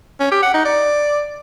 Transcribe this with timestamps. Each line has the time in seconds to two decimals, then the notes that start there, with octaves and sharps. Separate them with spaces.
0.20 C#4
0.31 G4
0.43 F#5
0.54 D#4
0.65 D5